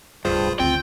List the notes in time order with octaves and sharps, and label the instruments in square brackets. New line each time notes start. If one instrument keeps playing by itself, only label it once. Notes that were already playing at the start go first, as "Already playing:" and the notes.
[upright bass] D1 C2 [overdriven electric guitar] G2 [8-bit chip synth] F4 G#4 C5
[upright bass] D2 D#3 [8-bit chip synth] C4 F4 [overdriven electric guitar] G5